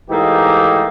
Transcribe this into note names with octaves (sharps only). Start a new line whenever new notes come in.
G#2 E3 A3 A#3 D#4 G4